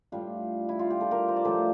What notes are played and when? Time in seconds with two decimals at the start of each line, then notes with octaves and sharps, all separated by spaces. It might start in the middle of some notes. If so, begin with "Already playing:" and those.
0.12 A2 G3 D4 F4
0.69 E4
0.79 F4
0.90 G4
1.01 A4
1.11 G4 A#4
1.29 C5
1.37 D5
1.44 A2 F3 A4 C5